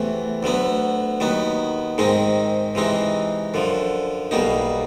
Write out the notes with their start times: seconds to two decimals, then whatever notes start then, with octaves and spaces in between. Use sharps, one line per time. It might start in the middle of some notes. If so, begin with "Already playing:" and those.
Already playing: E2 C3 E3 A3
0.43 D2 D3 F#3 B3
1.20 D#2 D#3 F#3 B3
1.98 G#2 D#3 G#3 C4 D#4
2.75 C3 E3 G#3 C4 D#4
3.54 F#2 D3 F3
4.31 B1 B2 G3 A#3 D#4